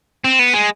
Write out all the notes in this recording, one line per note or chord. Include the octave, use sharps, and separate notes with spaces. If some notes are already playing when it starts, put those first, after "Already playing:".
C4
B3
G#3